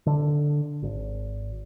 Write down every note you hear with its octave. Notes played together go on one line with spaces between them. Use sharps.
D3
G#1